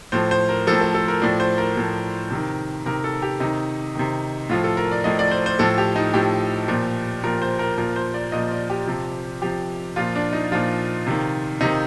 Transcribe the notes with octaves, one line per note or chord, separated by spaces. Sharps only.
A2 F3 C5
C5
A#4
A2 F3 A4
A4
A4
A#4
A2 F3 D5
C5
A#4
A2 F3
C3 D#3
C3 D#3 A#4
A4
G4
C3 D#3 D#4
C3 D#3
A2 F3 F4
A4
A#4
D5
A2 F3 D#5
D5
C5
C5
A2 F3 A4
G4
D#4
A2 F3 G4
A#2 F3
A#2 F3 A#4
C5
A#4
A#2 F3 A#4
C5
D5
A#2 F3 D#5
D5
G4
C3 F3
C3 F3 G4
A#2 F3 F4
D4
D#4
A#2 F3 F4
C3 D#3
C3 D#3 D#4